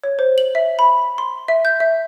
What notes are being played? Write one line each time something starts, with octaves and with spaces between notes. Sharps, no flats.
C#5
C5
F#7
E5
B5
C6
E5
G6
E5